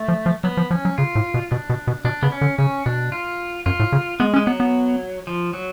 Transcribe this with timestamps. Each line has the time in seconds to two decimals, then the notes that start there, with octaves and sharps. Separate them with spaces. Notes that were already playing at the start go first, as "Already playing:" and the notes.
Already playing: A3
0.08 F3
0.26 F3
0.44 F#3 B3
0.57 F3
0.71 F3 C#4
0.85 F#3
0.98 C#3 F4
1.15 A2
1.34 B2
1.51 B2 D4
1.70 B2
1.87 B2
2.05 B2 D4
2.23 C#3 B3
2.32 C#4
2.41 D3
2.58 C#3 C#4
2.86 B2 D4
3.12 F4
3.66 F#2 F4
3.80 A2
3.92 C#3
4.20 G#3 B3
4.34 C#4
4.36 G#3
4.46 F#3 B3
4.60 B3
5.27 F3
5.53 F#3